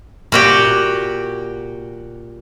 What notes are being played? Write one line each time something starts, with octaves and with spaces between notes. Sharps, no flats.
A#2 F#4 G4